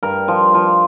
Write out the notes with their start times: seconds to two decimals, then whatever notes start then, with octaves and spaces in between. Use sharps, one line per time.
0.03 G2 A#4
0.28 F3
0.54 F3